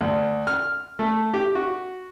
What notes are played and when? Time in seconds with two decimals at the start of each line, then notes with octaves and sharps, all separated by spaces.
0.01 D2
0.47 F6
0.99 A3
1.33 G4
1.55 F#4